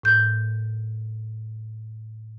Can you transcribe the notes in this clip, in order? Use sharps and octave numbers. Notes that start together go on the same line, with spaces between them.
A2 G6